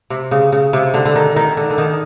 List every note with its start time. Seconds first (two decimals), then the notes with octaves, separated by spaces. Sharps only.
0.10 C3
0.31 C#3
0.52 C#3
0.73 C3
0.94 D3
1.05 D3
1.16 D#3
1.36 D#3
1.57 D3
1.71 D3
1.78 D#3